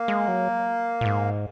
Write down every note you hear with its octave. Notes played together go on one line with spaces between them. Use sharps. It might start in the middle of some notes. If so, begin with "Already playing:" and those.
Already playing: A#3
G#3
F#3
A#2
G#2